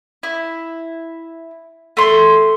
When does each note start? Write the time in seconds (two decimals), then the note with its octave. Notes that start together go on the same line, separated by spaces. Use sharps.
0.23 E4
1.97 A3 C6